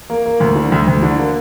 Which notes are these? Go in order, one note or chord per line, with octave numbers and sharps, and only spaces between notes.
A#3
A#3
D2
D3
D2
D2
D3
A#3